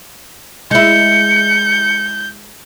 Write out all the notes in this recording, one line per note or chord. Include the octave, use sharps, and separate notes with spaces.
G#3 E4 G6 C#7